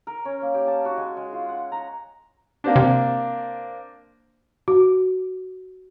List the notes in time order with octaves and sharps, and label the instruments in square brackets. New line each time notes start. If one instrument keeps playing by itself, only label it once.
[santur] A#4
C#4
A#3
G4
A5
F#4
G#3
G#3
F4
F#5
A#5
[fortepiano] A#3 C4 D4
[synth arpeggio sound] C3
[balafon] F#4